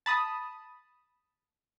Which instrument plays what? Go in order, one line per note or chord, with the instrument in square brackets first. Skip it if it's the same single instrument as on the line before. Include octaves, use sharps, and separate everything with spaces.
[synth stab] A5 B5 D#6